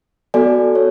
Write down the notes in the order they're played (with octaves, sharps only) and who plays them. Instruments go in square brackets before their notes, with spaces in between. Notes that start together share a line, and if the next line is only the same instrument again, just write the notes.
[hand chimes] B3 F#4 A4 D5 G#5
F#4 C#5